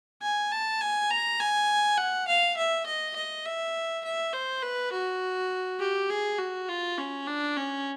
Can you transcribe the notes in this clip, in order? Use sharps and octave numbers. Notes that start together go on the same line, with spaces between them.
G#5
A5
G#5
A#5
G#5
F#5
F5
E5
D#5
D#5
E5
E5
C5
B4
F#4
G4
G#4
F#4
F4
C#4
D4
C#4